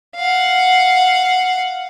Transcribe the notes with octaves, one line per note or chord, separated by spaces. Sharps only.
F5 F#5